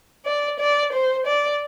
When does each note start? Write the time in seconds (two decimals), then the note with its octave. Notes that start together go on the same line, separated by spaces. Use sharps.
0.25 D5
0.60 D5
0.93 C5
1.27 D5